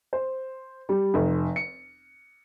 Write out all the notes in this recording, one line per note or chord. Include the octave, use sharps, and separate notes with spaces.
C5
G3
F1
C#7